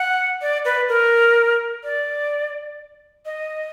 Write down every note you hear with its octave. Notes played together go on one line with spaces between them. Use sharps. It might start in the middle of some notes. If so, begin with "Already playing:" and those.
Already playing: F#5
D5
B4
A#4
D5
D#5